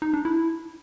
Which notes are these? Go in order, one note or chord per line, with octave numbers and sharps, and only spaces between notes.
D#4
D4
E4